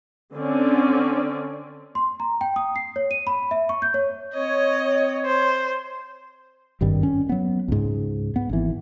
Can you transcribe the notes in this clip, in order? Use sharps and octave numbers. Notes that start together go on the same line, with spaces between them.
D3 C4 C#4 D5
C6
A#5
G5
D#6
C7
C#5
D#7
B5
E5
C#6
G6
C#5
C4 C#5 D#5
C5
G#1 G2 D#3 G3
C#4
F#3 B3
C#2 G#2
B3
G#1 E3